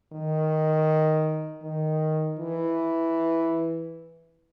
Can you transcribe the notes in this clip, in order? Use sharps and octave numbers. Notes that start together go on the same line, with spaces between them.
D#3
D#3
E3